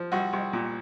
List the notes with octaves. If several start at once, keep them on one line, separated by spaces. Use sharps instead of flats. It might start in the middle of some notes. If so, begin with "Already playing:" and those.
Already playing: F3
C2 F#4
C2
A#2